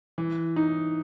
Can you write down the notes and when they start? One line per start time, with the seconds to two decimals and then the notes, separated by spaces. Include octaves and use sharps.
0.18 E3
0.56 D#4